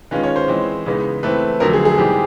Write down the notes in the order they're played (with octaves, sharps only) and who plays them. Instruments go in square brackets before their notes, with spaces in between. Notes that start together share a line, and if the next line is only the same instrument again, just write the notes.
[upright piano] D#3 G#3 C#4 F4 [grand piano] B4
[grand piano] C#5
C5
[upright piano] E3 G#3 C4
C#3 E3 G#3 B3 D#4
[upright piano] E3 A3 C4 [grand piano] B4
[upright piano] F2 D3 F#3 A3 [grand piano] A#4
[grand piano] G#4
G#4
[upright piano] G#2 E3 G3 C4 [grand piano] G4